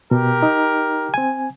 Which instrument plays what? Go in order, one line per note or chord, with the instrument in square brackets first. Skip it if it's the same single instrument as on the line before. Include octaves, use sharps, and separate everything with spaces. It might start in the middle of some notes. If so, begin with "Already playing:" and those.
[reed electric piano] B2 [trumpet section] G4 A#4
[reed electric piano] D#4
C4 G#5